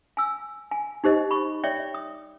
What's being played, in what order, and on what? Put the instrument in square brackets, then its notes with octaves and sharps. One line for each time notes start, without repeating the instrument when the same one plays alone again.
[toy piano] G#5 E6
G#5
D#4 G4 C5 D#5
B5 C#6
C#5 D5 E5 G5
D#6